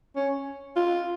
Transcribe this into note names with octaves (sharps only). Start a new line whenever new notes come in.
C#4
F4